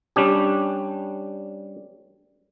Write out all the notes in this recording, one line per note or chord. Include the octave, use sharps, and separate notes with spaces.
G3 C#4 D4 G4